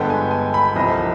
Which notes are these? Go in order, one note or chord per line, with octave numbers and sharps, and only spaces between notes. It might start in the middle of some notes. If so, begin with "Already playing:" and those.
Already playing: G1 G2 D3 G#3 B3 G5
G#5
G#5
B5
C2 C3 F3 D#5